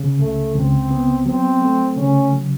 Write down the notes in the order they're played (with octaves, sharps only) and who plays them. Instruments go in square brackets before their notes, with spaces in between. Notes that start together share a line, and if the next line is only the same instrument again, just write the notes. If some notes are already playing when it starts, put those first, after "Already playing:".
Already playing: [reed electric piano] C#3
[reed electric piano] C#2 [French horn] A3
[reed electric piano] C#2 [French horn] C4
[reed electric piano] B3
[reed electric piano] F#3 [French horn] C4
[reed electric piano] A3
[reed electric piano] C#3 [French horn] C#4
[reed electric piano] F#3